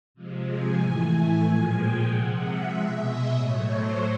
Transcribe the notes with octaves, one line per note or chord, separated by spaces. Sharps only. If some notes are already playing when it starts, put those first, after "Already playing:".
C3 F3 G#3
G#5
A2 E3 A3
A#2 F3 G#3 G#5
G5
C3 F3 G#3 F#5
E5
B2 G#3 E5
D#5
A2 F#3 A3 C#5
C5